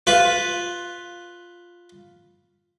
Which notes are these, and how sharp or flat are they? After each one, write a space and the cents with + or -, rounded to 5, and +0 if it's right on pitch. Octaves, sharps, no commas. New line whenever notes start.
F4 +5 B4 +0